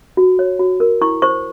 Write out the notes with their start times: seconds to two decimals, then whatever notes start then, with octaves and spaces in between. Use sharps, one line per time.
0.17 F#4
0.39 C#5
0.59 F#4
0.80 A#4
1.01 E4 C#6
1.22 C5 C#6